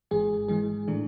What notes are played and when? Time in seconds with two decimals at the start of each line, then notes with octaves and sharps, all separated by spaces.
0.11 G#1 G#2 E3 G#3 G#4
0.48 G#2 E3 G#3 G#4
0.88 A2 E3 A3 D4